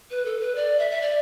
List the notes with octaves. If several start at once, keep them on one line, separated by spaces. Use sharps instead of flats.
B4
A4
B4
D5
E5
E5
D5